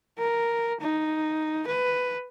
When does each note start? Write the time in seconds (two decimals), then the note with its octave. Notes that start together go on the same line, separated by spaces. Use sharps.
0.18 A#4
0.80 D#4
1.67 B4